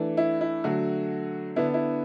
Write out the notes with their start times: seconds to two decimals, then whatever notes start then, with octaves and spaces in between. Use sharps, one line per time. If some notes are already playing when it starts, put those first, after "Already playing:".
Already playing: E3 A3 D4
0.17 E4
0.41 E4
0.64 D3 F#3 A3 F#4
1.56 D3 B3 D4 E4
1.74 E4